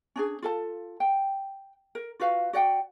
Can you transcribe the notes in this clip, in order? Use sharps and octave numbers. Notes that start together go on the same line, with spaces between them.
C#4 D4 G#4
F4 A4 A5
G5
A#4
F4 F#4 B4 F5
F#4 D5 F#5 G5